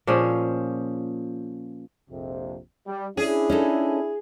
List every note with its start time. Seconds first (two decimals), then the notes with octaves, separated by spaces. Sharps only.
0.07 A#2 F3 C#4 G#4
2.10 A#1 F2 C3
2.87 G3
3.17 C#4 D4 E4 G#4
3.50 C#4 D#4 A4